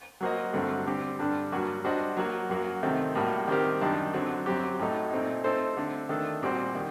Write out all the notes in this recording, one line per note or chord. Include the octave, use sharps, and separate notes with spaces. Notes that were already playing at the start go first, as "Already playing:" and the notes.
F#3 A#3 F#4 C5 D#5
G2 D3 F#3 A3 C4
D3 G3 C4 G4
G2 D3 G3 D4
G2 F#3 A#3 F#4
G3 D4 F#4 C5 D#5
F#3 A#3 F#4
F#2 F#3 A#3 F#4
C3 D#3 A3 C4
A2 G3 A#3 F#4
D#3 G3 C4 G4 A#4
F#2 D#3 G3 D4
D3 F#3 C4
F#2 F#3 C4 G4
A2 F#3 A3 D#4
A#2 A3 C4 D#4
A3 C4 D#4 A4 C5
D3 A3 C4
D#3 A3 D4 A4
A#2 G3 C4 F#4 C5
D#3